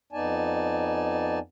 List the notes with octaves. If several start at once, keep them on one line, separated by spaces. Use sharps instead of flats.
F2 B3 D#4 D5 G#5 A5